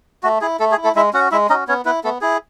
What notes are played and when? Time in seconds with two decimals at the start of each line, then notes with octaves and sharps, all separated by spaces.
0.23 A3 F#4
0.41 E4 G#4
0.60 A3 A4
0.72 G#4
0.78 E4
0.84 A3 A4
0.95 G#3 E4 E5
1.13 C#4 F#4 F#5
1.31 G#3 E4 E5
1.49 C#4 D#4 D#5
1.54 F#4
1.68 B3 C#4 C#5
1.85 B3 E4 B4
2.04 A3 B3 A4
2.21 E4 G#4